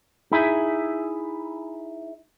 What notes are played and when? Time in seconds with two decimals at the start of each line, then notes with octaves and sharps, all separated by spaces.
0.32 D#4 E4 G#4 E5